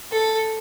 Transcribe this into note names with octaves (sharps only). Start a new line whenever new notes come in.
A4